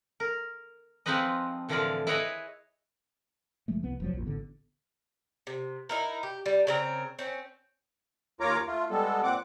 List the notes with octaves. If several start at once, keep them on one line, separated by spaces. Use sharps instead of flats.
A#4
F3 G#3 C4 D#4 B4 D#5
A2 D3 E3 F3 A#4 D5
E4 G#4 B4 C#5 D#5
F#1 F3 G#3 A3
C2 B3
F1 F3 F#3
A#1 E2 A#2
A1 D3 B3
C3
D#4 E4 A#4
G4
G3
C#3 C4 A#4
C4 C#4
D#2 F4 A#4 C#5 A#5 D6
A3 F4
G3 G#3 B3 A4
A#2 C4 F#5 D6